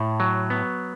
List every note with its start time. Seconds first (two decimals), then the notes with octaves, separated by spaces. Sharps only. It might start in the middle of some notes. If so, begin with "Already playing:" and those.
Already playing: A2
0.20 F#3
0.50 B3